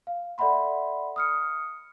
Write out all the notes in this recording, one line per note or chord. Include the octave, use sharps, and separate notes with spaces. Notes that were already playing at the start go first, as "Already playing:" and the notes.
F5
A4 D5 E5 F#5 B5 C6
D#6 F6 C#7